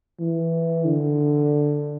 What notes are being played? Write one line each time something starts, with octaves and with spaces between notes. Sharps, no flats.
E3
D3